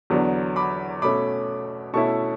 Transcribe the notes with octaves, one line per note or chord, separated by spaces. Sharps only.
E2 D3 F#3 B3 D4
B5 D6
B2 A3 C#4 B5 D6
B2 A3 C#4 E4 A5 C#6